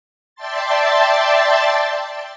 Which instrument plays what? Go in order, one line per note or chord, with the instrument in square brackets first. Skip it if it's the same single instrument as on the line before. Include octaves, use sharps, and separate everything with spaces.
[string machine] D5 E5 G5 A5 C6 A6